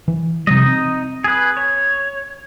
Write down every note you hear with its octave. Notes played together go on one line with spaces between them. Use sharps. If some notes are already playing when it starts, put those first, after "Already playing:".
E3
C3 F3 G3 D#4 D#5
C4
G#4 B4
C#5